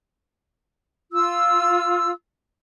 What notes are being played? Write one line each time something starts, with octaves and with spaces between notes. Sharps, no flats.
F4 E6